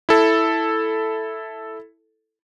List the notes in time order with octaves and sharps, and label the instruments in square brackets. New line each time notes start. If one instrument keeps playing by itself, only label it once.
[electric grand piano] E4 A4